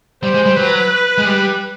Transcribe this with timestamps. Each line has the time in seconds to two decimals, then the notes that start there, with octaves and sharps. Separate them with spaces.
0.23 G3 C5
0.34 G#3
0.46 G3
0.56 F#3 B4
1.18 G#3
1.25 G3